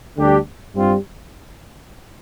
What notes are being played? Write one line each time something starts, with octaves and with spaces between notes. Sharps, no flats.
D2 D3 G3 D4 G4
G2 G3 C4 F4